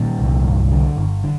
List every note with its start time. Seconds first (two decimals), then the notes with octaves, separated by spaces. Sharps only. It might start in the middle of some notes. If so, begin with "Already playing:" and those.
Already playing: A#2 D#3
0.19 C2
0.44 G1
0.71 D3
0.97 G1
1.23 D3